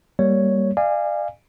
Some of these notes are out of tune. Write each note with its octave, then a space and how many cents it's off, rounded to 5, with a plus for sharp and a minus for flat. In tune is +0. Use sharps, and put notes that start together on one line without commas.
G3 +0 A#3 +0 C#5 +0
D5 +35 F5 -20 G#5 -15